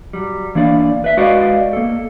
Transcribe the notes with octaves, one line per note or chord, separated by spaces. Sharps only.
F#3 G3
E3 A#3 D4 D5 F5
B4 E5
G#3 F#4 B4 D5 D#5 F5
A#3 A4